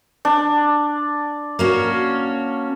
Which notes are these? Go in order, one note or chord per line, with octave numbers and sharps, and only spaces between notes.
D4
A#3 C#4 F#4